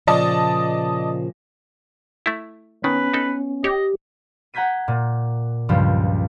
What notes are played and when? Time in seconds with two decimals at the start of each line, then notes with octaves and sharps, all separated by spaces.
0.07 A#2 C#3 F3 D5 D#5 A5
2.26 A3 E4
2.84 D#3 B3 C#4 B4
3.14 D#4 A4
3.64 G4 C#5 D#5
4.54 F#5 A#5 G6 G#6 B6 D#7
4.88 A#2
5.69 C#2 G2 F3 G4